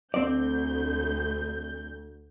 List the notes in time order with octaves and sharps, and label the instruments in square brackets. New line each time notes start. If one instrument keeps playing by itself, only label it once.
[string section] D2 G6 [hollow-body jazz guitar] C4 D5